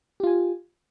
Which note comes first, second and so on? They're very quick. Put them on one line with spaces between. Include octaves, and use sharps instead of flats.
G4 F4 G#5